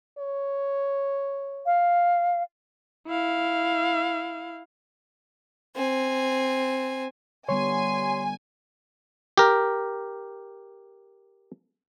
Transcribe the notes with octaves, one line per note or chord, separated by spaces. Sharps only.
C#5
F5
E4 F5
C4 G#5
D3 G3 B3 C#5 G#5 C6
G4 A#4